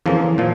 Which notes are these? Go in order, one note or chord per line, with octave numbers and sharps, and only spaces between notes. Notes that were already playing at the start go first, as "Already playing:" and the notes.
F2 C#3 E3 F3 A#3
A#2 F3